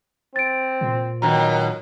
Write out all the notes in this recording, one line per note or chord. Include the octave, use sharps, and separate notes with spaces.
C4 A6 D7
A#2
B2 D#3 F#3 A#5